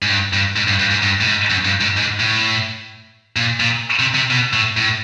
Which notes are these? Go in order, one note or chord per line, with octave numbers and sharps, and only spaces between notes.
G#2
G2
G2
G#2
G2
G2
G#2
G2
A2
G#2
F#2
G2
G#2
G#2
A2
A#2
A#2
C3
C3
B2
A2
A2